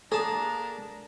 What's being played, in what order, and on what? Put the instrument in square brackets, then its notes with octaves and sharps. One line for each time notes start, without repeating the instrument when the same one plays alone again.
[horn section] A#3 D4 [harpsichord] G#4 A5 [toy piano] A4 [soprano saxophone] A#5